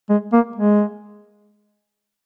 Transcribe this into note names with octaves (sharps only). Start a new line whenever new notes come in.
G#3
A#3
G#3